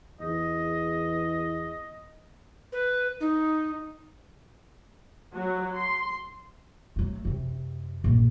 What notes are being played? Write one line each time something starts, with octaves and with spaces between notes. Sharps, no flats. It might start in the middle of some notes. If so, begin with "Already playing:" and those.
E2 D#5
B4
D#4
F#3
C6
F#3 A3
F#2 C3
A#1 G2